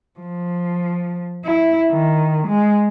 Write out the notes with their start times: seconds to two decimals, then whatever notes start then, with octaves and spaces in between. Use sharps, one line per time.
0.19 F3
1.45 E4
1.90 D#3
2.47 G#3